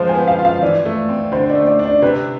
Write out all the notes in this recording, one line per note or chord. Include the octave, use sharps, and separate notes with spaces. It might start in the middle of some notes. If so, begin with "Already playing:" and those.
Already playing: F3 G#3 C5 F5
G#5
B3
F5
F4
F5
E3 D5
A3
C4
D3 C5
D5
A3
D5
D4
D5
C3 B4